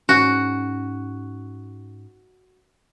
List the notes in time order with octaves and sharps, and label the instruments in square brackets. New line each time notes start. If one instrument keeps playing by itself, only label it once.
[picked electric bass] G#2 C#4 [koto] F#4